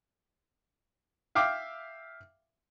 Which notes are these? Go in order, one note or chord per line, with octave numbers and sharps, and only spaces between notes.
E5 F5 G5 D6